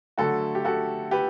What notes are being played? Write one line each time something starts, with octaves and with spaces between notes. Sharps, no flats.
D3 F#3 A3 F#4 A4
G4
F#4 A4
G4 B4